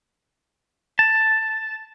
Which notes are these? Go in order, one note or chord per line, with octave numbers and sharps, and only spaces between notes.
A5